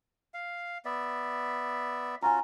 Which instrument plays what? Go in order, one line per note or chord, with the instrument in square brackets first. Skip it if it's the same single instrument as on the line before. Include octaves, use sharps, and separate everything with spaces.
[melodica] F5
B3 D5 E5
[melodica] C#4 F4 F#4 [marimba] G#5 A#5